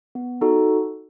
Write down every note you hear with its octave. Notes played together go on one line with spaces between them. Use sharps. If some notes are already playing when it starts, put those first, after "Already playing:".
B3
D#4 F#4 A4